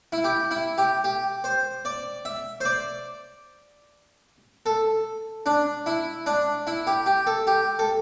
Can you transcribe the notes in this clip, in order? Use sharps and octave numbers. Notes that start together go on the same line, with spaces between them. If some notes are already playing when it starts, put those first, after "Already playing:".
E4
G4
E4
G4
G4
C5
D5
E5
C5
D5
A4
D4
E4
D4
E4
G4
G4
A4
G4
A4